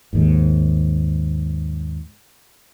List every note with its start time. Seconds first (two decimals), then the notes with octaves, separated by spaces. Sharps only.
0.13 D#2 G#2